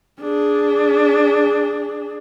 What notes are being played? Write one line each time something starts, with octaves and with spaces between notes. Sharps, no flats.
D4 G#4